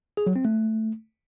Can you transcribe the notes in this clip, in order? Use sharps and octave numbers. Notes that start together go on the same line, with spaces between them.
G#4
F#3
C4
A3